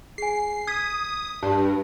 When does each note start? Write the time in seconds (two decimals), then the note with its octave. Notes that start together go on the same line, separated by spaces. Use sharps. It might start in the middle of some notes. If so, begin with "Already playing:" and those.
0.18 G#4 G#5 C7
0.67 D#6 G#6 B6
1.43 G2 G4 A5